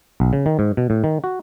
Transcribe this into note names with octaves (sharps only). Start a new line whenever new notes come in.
B1
C#3
D#3
G#2
B2
A2
D#3
F#4